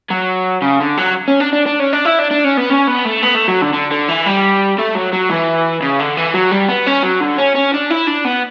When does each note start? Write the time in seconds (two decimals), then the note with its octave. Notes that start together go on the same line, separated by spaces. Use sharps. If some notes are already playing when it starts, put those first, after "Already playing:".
0.11 F#3
0.62 C#3
0.80 D3
0.97 F#3
1.28 C#4
1.40 D4
1.53 D4
1.66 D4
1.80 C#4
1.93 D4
2.05 E4
2.19 D4
2.31 D4
2.44 C#4
2.57 B3
2.70 C#4
2.88 B3
3.05 A3
3.23 B3
3.35 A3
3.48 F#3
3.62 D3
3.74 D3
3.91 D3
4.09 E3
4.26 G3
4.78 A3
4.95 F#3
5.13 F#3
5.30 E3
5.82 C#3
5.99 D3
6.17 E3
6.34 F#3
6.51 G3
6.69 B3
6.87 C#4
7.03 F#3
7.21 D3
7.38 C#4
7.55 C#4
7.73 D4
7.90 E4
8.07 D4
8.25 B3